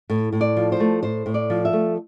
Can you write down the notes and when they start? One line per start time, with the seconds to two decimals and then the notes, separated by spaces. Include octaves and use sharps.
0.10 A2
0.33 A2
0.41 D5
0.57 F3
0.72 C5
0.80 A3
1.03 A2 C5
1.26 A2
1.34 D5
1.50 F3
1.65 E5
1.73 A3